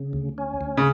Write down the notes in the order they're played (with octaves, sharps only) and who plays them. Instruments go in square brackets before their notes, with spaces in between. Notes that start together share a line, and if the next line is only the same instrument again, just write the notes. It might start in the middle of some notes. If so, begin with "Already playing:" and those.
Already playing: [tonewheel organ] C#3
D2
C#4
D2
[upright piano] C#3